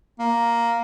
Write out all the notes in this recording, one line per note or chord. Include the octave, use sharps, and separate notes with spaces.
A#3